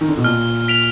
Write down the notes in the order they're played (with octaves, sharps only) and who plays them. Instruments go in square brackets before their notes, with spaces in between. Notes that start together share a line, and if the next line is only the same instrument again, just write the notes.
[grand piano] D#3
D3
B2
[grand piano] A#2 [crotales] F6
[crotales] B6 D7 F7